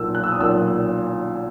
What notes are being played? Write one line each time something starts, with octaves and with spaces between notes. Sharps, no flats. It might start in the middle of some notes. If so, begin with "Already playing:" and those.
Already playing: B1 A#2 A#3 E6
F#6
E6
D#6
B1 A#2 A#3 E6